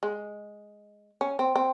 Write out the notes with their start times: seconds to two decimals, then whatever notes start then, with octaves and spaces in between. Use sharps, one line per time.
0.03 G#3
1.21 C#4
1.39 C4
1.56 C4